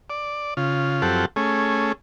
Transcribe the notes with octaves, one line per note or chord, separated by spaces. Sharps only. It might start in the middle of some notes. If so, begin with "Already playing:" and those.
D5
C#3 F4
F#2 F3 C4 G4 A4 F#5
A3 C#4 G#4